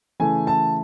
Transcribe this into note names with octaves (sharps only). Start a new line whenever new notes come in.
C#3 E3 A3 G#5
A5